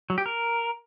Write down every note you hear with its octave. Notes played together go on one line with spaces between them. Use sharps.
F#3
G4
A#4